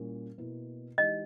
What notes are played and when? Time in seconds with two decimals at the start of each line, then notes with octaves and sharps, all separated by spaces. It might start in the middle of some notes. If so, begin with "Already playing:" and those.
Already playing: A#2 G3 C#4 E4
0.38 B2 A#3 E4
0.98 E3 G#3 D#4 G4 D#5